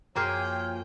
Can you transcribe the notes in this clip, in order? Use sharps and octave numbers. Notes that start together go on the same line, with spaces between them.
F#2 F3 A#3 G#4 C#5 G5 F6